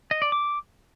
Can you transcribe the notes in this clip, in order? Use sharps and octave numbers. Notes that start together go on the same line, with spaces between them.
D#5
D5
D6